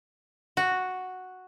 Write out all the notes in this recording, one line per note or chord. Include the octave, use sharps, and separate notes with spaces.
F#4